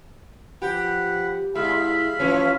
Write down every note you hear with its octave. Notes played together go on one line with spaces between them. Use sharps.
F3 G4 B4 F#5
G#3 E4 E5 F5 B5
A2 E3 F3 C#4